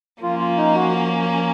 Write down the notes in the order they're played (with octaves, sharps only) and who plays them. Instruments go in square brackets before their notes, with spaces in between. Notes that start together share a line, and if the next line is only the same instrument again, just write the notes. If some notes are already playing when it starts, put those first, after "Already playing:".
[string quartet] F3 A#3 C#4 [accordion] F4
[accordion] F4
D#4
F#4